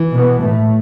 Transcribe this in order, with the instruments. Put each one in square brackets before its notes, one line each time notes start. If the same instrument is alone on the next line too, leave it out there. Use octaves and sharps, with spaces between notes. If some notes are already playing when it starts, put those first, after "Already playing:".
Already playing: [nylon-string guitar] E3
[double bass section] B2 B3
A2 A3